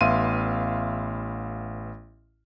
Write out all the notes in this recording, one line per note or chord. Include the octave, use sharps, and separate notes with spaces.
A1 B3 E5 F5 C6 D#7